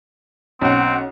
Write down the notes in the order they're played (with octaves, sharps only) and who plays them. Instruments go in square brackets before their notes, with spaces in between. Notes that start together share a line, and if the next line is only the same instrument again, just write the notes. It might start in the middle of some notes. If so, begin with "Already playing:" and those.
[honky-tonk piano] B1 F#5 [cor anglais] C4 [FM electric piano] C#4